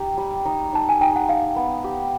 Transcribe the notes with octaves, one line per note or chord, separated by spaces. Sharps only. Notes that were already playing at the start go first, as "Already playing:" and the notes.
Already playing: D#4 G4
G3
D#4
D#4 A5
G#5
D#4 G5
F#5
D#4 F5
B3
G4